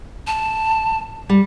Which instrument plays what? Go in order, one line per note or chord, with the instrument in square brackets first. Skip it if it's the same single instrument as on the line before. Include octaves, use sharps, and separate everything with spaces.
[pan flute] A5
[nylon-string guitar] G3